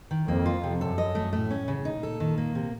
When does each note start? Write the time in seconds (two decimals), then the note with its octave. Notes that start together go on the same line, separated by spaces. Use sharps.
0.11 D#3
0.28 F2 A#3
0.46 F4
0.64 C3
0.81 F#2 A4
0.98 D#5
1.15 A3
1.33 A2 A3
1.50 C#4
1.68 C#3
1.85 A#2 D#4
2.03 A4
2.20 D#3
2.38 A#3
2.55 C3